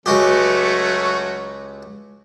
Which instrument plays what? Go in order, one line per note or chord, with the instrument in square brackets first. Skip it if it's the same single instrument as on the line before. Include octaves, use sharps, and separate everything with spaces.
[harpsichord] C#2 F#4 G4 [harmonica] F#3 A3 C#4